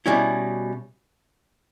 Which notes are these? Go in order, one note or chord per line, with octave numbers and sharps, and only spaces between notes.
B2 G3 C#4 E4